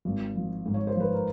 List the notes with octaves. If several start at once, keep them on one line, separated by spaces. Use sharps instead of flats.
G#1
F3
G#2
C#5
C5
F3
B4
A#4